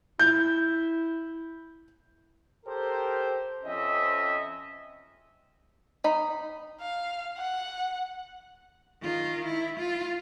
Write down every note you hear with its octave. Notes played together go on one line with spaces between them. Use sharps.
E4 G6
G4 A4 A#4 C5
F2 C4 C#4 D#5 E5
D#4 B5
F5
F#5
D#3 F4
E4
F4